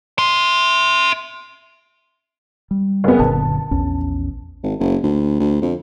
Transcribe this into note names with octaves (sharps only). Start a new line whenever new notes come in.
E5 C6
G3
F#1 B3
F#1 A#2 D3 A5
A#1 E2 C#4
G#1
F#1
D2
D2
F2